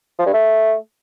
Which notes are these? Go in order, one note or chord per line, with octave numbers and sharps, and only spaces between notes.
F3
G2
A3